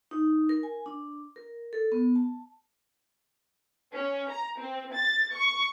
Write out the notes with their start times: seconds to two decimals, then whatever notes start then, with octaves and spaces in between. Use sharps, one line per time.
0.11 D#4
0.49 A#4
0.63 G#5
0.86 D4
1.36 A#4
1.73 A4
1.92 B3
2.16 A5
3.94 C#4
4.31 A#5
4.60 C4
4.93 A6
5.33 C#6